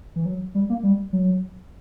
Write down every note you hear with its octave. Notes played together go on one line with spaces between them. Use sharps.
E3
F#3
G3
A#3
G3
F#3